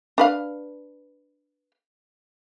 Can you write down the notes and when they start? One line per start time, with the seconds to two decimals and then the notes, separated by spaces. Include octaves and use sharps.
0.18 D4 B4 F5